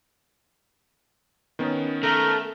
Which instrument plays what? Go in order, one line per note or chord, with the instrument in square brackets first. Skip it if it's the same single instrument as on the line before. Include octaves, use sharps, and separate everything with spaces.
[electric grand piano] D#3 B3 C#4
[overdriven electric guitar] A3 [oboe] A#4